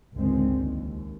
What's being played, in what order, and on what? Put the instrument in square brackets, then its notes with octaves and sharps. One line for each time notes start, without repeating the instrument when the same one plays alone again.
[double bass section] G1 C#2 D#3 G#3 C4
D#2